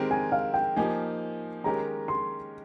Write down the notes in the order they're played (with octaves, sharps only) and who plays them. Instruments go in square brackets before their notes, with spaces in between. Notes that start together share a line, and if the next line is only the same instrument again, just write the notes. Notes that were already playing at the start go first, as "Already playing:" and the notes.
Already playing: [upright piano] D#3 G#3 C4 G4 A#4
[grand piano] G#5
F5
G5
[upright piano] F3 A#3 D#4 G4 [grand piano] G#5
[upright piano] D#3 G#3 C#4 G4 A#4 [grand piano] A#5
[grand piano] C6